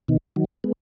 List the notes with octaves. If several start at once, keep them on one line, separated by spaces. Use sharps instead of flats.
B2 D#3
D#3 F#3
G#3 B3